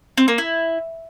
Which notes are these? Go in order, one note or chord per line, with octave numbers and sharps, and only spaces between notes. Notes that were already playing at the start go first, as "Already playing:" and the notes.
C4
A#3
E4